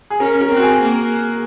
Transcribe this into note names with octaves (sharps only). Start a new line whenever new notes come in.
G#4
C#4 A#4
A#4
C4
F#4
G#4
A#3